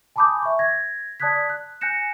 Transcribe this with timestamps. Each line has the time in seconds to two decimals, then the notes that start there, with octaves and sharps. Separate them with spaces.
0.16 G#5 A5 B5 D6 D#6 G6
0.42 E5 C#6
0.59 G#6 A#6
1.20 D5 A5 D#6 F#6 G#6 B6
1.50 F#6
1.81 G#5 F#6 G6 A#6 C#7 E7